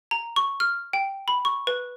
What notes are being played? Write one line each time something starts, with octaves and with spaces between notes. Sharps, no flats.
A#5
C#6
F6
G5
B5
C#6
B4